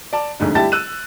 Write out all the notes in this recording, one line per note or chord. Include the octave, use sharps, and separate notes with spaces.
D5 A5
F1 D2 G#2 D3
G3 E4 G4 A5 A6
E6 F#6 D#7